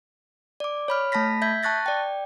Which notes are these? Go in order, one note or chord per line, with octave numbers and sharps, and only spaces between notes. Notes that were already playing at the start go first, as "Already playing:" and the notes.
D5 D6
C#5 B5 F6
A3 A5 B5 A#6 B6
E5 G6 G#6 B6
A5 C#6 F#6 A6 A#6
D5 G5